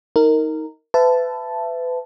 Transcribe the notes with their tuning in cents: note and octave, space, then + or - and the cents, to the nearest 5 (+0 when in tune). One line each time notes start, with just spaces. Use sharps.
D#4 +20 A#4 -15
B4 +30 E5 +25 A5 -5